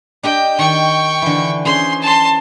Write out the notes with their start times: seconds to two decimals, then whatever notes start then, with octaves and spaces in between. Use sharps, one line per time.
0.23 D4 G4 D#5 G5
0.59 D#3 G5 C#6
1.22 D3 E3
1.65 C#4 G#4 C5 C6
2.02 A5 C6